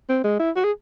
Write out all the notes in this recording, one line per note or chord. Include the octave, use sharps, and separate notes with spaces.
C4
G#3
E4
F#4
G#4